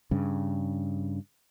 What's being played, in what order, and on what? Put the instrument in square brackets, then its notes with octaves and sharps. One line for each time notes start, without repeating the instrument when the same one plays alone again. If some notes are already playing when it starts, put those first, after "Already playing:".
[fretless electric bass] G2 C#3